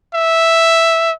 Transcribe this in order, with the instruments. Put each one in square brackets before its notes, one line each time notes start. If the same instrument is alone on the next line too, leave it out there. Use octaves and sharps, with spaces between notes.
[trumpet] E5